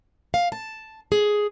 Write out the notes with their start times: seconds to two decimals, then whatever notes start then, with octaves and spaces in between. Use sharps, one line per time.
0.34 F5
0.52 A5
1.12 G#4